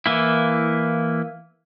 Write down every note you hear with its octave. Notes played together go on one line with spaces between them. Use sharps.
E3 A#3 E4